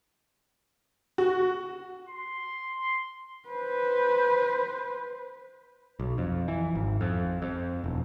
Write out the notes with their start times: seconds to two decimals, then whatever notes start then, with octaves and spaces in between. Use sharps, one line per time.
1.18 F#4
2.09 C6
3.48 B4 C5
6.00 B1
6.18 F2
6.48 E3
6.75 G#1
7.01 F2
7.42 F2
7.84 E1